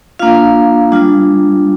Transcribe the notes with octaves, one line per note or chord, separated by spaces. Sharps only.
A#3 D4 F4 F5
G3 D4 F4